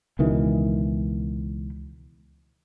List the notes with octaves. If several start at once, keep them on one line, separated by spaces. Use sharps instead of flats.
C#2 B2 D#3 E3